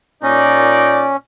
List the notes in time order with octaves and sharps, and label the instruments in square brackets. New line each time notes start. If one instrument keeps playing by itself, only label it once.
[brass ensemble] A#2 D5 [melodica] C#4 [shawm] D#4